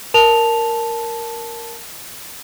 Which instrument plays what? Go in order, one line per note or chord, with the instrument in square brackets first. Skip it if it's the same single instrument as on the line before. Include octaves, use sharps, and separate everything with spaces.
[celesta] A#4 A5 F7